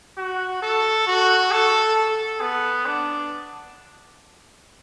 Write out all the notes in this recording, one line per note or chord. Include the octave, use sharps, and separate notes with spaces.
F#4
A4
F#4
A4
A4
B3
D4